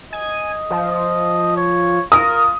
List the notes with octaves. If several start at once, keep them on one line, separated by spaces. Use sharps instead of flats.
D#5 G#5
F3
C#5
F4 A#4 D#6